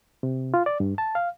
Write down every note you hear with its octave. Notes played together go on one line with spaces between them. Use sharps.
C3
F4
D5
G2
A5
F5